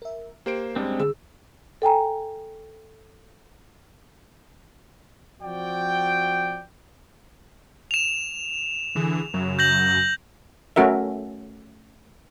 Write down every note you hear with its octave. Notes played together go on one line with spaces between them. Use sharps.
A#4 E5
A#3 G4 C5 D7
F#2 G3 G#3 C4 D4
D3 G#4 E6
A4 G5 G#5 A#5
F3 C4 F#4 D5 G5
E7 F7
D3 E3 G#4
F#2 C#3 F#3
G6 A#6 F#7
A3 C#4 F#4 A#4 E5